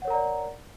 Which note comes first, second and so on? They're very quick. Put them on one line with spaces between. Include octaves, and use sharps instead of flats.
F#5 C#5 A#4 A#5 D5